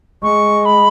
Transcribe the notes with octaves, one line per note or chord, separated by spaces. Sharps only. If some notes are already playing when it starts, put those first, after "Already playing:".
G#3 C#6
B5